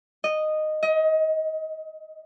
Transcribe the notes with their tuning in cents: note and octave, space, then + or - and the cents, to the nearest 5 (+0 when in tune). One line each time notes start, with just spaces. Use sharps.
D#5 -10
D#5 +25